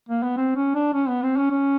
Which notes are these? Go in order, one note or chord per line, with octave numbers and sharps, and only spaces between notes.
A#3
B3
C4
C#4
D4
C#4
B3
C4
C#4
C#4